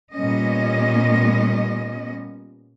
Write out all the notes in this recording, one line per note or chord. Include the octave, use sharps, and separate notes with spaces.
A#2 G3 B3 C#4 D#5